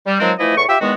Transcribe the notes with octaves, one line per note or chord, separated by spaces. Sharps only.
G3
D#3 F3 F#3 G#3 C4
E3 F3 A3 E4 D#5
E2 A2 C#6
F4 G4 E5
E2 D#3 G#3 B3 F#4